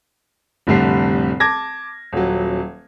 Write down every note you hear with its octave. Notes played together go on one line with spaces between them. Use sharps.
F1 A2 D3 G3 C7
A5 D6 G#6 A#6
D#1 F#3